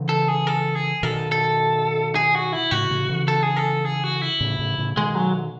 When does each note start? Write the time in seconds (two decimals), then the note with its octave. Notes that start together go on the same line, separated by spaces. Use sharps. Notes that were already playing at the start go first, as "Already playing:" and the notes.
Already playing: C#3 E3
0.09 A4
0.28 G#4
0.47 A4
0.75 G#4
1.03 B2 D#3 A4
1.32 A4
2.15 G#4
2.35 F#4
2.53 E4
2.71 A2 C#3 F#4
2.90 A2 C#3
3.09 C#3 E3
3.28 A4
3.43 G#4
3.56 A4
3.85 G#4
4.04 F#4
4.22 E4
4.41 A2 C#3
4.59 A2 C#3
4.78 A2 C#3
4.97 B2 D#3 G#3
5.15 F#3